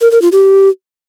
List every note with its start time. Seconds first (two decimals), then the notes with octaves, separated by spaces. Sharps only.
0.01 A#4
0.11 A#4
0.22 F4
0.32 G4